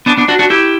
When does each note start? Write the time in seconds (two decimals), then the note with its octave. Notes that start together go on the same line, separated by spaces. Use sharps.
0.06 B3 D4
0.17 B3 D4
0.28 D4 F#4
0.39 D4 F#4
0.50 E4 G4